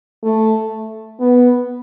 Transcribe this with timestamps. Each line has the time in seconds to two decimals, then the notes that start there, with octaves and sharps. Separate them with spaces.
0.24 A3
1.20 B3